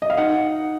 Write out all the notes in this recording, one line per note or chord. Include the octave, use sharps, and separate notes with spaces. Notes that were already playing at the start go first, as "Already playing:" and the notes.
D#5
F5
D#4 F#5